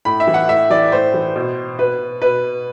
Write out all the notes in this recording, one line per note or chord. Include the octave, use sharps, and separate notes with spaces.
A2 B5
E5
E3
F#5
A2 E5
E3 D5
A2 C5
E3
B2
B2 B4
B2 B4